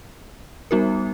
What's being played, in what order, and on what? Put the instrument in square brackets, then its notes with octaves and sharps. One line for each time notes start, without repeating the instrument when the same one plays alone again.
[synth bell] G3 B3 D#4 F#4 A#4